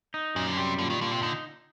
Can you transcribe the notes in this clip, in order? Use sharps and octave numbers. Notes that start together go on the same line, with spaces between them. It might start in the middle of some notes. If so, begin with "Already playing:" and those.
D#4
F#2 A#2
D3
C3 G3
A#2 D3
D#3
A#2 D3
C3
D3 D#4